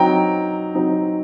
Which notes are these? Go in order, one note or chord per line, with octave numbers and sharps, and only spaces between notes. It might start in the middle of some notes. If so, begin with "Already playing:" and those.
Already playing: F#3 C4 D#4 G5 A#5
F#3 C4 D#4